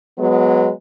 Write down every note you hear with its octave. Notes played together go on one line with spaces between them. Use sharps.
F#3 G#3 B3